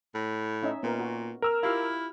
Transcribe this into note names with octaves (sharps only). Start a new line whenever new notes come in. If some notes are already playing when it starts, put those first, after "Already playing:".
A2
C#4 D#4 E5
A#2 B3 A#4
F#4
A#4 E6 F6
E4 F4 G4 F5